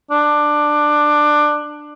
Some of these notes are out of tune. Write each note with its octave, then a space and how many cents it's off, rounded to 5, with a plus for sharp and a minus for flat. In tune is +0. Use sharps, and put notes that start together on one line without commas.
D4 +15